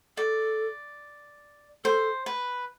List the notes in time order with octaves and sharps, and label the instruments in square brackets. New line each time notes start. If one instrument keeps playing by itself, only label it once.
[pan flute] A4 [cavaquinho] D5
[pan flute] A4 [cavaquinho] C5
[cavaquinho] B4